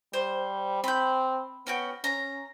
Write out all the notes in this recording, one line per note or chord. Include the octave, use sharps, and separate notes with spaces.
G3 C5
C4 B5 G6
B3 C#4 F#4 G5
C#4 A#5